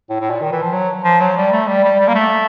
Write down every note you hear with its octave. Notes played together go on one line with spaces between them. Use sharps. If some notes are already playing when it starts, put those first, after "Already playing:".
A2
A2
A#2
D#3
E3
F3
F#3
F3
F#3
G3
A3
G3
G3
G3
A#3
A3